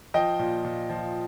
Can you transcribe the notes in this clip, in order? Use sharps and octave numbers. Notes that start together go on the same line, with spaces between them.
F3 D#5 G5
A#2
A#2
F3